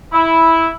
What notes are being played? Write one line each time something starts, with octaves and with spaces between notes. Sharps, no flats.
E4